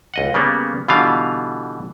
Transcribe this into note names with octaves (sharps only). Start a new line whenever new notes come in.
C#2 D#5 F#5
C#3 G3 A#3 B3
B2 D3 E3 G3 F4 F5